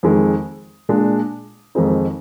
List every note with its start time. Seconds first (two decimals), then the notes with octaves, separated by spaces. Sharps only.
0.03 F2 D#3 G#3
0.89 A#2 G#3 D4
1.75 F2 D#3 G#3 C4 D#4